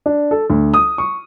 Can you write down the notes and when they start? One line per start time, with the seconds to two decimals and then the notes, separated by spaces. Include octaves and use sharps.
0.06 D4
0.31 A4
0.50 D2
0.74 D#6
0.98 C#6